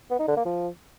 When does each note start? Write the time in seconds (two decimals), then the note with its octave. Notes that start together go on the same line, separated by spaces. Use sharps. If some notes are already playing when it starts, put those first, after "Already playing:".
0.10 B3
0.19 D#4
0.28 D3
0.37 A#3
0.45 F3